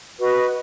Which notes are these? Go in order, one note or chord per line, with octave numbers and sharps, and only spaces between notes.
F#4 B4 D#5